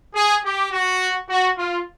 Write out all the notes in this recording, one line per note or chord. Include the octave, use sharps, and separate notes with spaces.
G#4
G4
F#4
F#4
F4